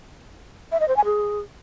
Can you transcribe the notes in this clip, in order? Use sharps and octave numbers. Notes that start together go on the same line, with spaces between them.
E5
D#5
C5
G#5
G#4